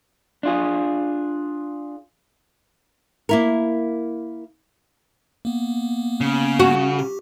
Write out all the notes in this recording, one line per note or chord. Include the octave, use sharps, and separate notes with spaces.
D4 F4 G#4
A#3 E4 A#4
A#3 B3
C#3
F#4
G4